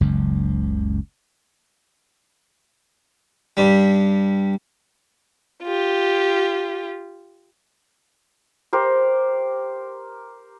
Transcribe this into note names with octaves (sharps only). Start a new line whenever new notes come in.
F#1 C#2 F#2
G2 G3
F4 G4
G4 A#4 C5